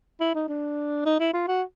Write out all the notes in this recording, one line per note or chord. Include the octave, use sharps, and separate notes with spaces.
E4
D#4
D4
D#4
E4
F4
F#4